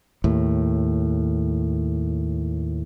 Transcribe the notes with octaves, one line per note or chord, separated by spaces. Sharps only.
D#2 A2